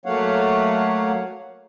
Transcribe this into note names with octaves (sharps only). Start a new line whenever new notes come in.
F#3 A3 A#3 C#5 F5 F#5